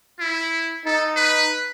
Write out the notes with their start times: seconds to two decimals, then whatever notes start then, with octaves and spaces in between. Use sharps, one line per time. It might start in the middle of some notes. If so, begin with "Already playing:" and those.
0.20 E4
0.85 D#4 A4
1.16 B4